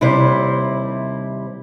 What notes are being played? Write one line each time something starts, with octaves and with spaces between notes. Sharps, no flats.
D#2 C3 G3 E4 C5